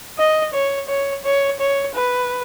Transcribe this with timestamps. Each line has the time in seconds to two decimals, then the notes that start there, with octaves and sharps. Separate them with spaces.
0.18 D#5
0.54 C#5
0.88 C#5
1.25 C#5
1.60 C#5
1.95 B4